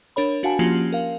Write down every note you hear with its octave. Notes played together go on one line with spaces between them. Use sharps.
D4 A#4 C#5 B5
D4 F#4 F5 F#5 G#5 A5
F3 A#3 C#4 F4 G4 F#7
A#4 F5